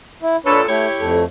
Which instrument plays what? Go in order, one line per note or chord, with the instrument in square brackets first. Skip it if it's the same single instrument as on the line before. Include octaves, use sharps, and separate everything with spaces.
[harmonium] E4
[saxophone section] A#2 A4 [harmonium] D4 B4 C#5
[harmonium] A3 [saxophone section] E4 G4 C#5
[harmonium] F2 A3